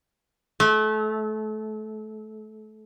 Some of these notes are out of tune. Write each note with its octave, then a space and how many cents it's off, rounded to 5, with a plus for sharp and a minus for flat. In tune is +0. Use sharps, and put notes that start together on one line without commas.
A3 -30